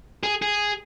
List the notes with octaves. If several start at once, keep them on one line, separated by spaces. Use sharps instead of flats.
G#4
G#4